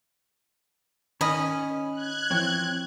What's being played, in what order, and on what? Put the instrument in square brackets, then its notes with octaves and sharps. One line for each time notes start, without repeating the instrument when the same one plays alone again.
[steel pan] D#3 [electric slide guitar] C#4 G#5 [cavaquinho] D#5 B5
[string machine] F#6 G#6
[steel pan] E3 F3 C#5 [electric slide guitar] C4